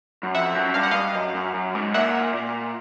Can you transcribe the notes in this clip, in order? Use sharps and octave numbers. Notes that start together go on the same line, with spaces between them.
F#2
F2 E5 F#5
F#2
G2 F5
F#5
G2 D#5 F5
F#2
F#2
F#2
G#2
A#2 E5 F#5
A#2